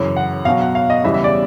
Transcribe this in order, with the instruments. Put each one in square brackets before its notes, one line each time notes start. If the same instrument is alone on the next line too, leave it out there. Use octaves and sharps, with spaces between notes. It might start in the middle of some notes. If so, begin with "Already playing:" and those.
Already playing: [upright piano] F#2 C#3 E3
F#5
B2 F5
F#3
F#5
F5
D#5
E2 C#3 E3 G3 E5
E5
D5